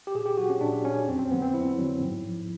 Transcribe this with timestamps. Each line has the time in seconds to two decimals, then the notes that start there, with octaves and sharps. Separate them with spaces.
0.07 G4
0.15 A#2 G#4
0.26 G4
0.37 F#3 F#4
0.50 C#4
0.61 A#2 D4
0.84 F#3 C#4
1.07 F2 C4
1.19 C4
1.31 D3 F#3 B3
1.42 C4
1.54 F2 E4
1.78 D3 F#3
2.01 G#2
2.24 F3